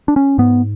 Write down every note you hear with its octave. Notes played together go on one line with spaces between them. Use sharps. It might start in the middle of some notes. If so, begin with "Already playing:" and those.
D4
C#4
G#2 B3